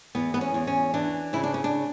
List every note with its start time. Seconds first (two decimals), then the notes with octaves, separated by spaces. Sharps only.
0.15 E2 B3
0.34 B3
0.41 C#4
0.54 E2
0.67 C#4
0.94 E3 D4
1.33 C#3 E4
1.44 D4
1.54 C#4
1.64 D4